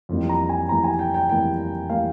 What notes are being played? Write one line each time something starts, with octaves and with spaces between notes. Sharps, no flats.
F2 E3 G3 A#3
A#5
G#5
F2 E3 G3 A#3 A#5
G#5
G5
G5
F2 E3 G3 A#3 G5
E3 G3 A#3 F5